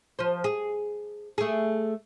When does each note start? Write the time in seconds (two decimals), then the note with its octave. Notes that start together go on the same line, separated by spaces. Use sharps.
0.19 F3 C5
0.44 G#4
1.38 A3 G#4